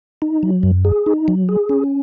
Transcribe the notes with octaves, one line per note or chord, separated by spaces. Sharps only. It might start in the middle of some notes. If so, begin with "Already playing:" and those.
D#4
F#3
F#2
G#4
D#4
F#3
G#4
C#4